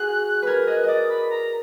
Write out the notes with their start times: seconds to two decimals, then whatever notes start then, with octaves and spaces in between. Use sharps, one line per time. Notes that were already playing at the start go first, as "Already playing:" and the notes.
Already playing: F#4 G#4 F#6
0.42 A#4 B4 G#6
0.67 D#5 F#6
0.84 D5 D#5 D#6
1.09 B5
1.30 A#5